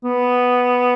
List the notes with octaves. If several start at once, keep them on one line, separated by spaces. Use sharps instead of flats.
B3